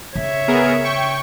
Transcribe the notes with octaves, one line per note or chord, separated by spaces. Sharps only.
C#3 C#5 E5
B3 G#4 A#4
G5 C#6